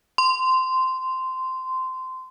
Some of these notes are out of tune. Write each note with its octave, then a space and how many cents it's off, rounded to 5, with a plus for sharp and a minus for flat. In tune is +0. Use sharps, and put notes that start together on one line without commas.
C6 -15